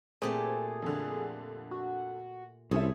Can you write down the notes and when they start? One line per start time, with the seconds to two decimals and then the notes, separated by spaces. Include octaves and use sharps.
0.22 A#2 A3 C4 G4 G#4
0.82 F2 D3
1.71 F#4
2.71 C2 C4 C#4 E4 G#4 A4